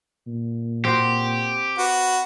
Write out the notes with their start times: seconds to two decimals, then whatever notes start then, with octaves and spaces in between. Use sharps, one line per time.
0.27 A#2
0.85 C4 F#4 G4 C5
1.78 F#4 B4